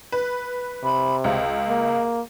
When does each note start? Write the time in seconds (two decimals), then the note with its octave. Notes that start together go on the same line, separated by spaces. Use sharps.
0.12 B4
0.84 C3 B5
1.24 C#2 F5
1.69 A#3